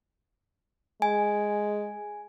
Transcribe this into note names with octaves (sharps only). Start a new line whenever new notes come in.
G#3 G#5